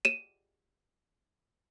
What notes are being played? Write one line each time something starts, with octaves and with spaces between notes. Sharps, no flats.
D#7 E7